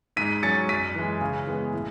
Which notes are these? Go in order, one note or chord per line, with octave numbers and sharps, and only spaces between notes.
G#2 B6 D#7
F#3 C#4 A6 C#7
F#2 B6 D#7
E3 G#3
C#3
E3 G#3 B3
A2